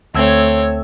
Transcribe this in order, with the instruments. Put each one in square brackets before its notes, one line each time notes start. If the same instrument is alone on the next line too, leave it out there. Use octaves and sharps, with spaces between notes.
[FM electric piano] D2 E6 G#6 [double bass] A3 [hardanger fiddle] C4 C#5